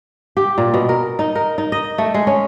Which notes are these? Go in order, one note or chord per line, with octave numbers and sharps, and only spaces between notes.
G4
A#2
B2
A#4
D#4
A#4
D#4
D#5
A3
G#3
C#4